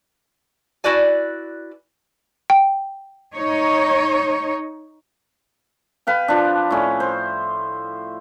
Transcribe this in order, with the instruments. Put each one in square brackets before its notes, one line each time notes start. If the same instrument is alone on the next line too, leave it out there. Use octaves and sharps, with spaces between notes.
[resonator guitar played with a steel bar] E4 F#4 B4 D5 G#5
[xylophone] G5
[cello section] D#4 C#5
[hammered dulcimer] B4 F5 G5
F3 D4
A2 C#4
C5